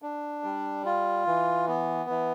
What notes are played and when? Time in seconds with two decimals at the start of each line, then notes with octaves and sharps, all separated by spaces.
0.02 D4
0.44 G3
0.86 F4
1.27 E3
1.68 B3
2.10 E3